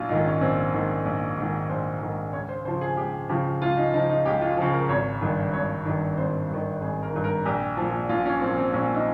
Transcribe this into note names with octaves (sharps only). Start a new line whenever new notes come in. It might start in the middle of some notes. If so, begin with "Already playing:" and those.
Already playing: A#1 F4
G#2 D#3 D#4
C#4
A#1 C4
G#2 D#3
A#1
G#2 D#3
A#1 C5
G#2 D#3
C#2 C#5
C5
C#3 F3 C5
G#4
C#2 G4
C#3 F3 G4
C#2 F4
D#4
C#3 F3 D#4
D#4
C#2 G4
F4
C#3 F3 G#4
A#4
G#1 C#5
G2 D#3
G#1 C#5
G2 D#3
G#1 C5
G2 D#3
G#1 G#4
A#4
G2 D#3
A#4
A#1 G4
A#2 F3
A#1 F4
C#4
A#2 F3 C4
C4
A#1 C#4
D#4